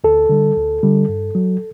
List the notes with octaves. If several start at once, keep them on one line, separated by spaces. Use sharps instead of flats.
D2 A4
D3 G3
D2
D3 G3
G2
F#3